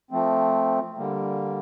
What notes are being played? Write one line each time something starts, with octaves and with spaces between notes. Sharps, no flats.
F3 A3 C4
D3 G3 A#3